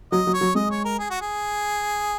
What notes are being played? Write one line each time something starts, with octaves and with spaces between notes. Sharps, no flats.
F#3 D#5
F#3
C#5
F#3
G#3 D#5
C#5
A#4
G#4
F#4
G#4